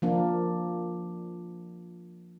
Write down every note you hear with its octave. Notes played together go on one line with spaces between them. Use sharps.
F3 A#3 D4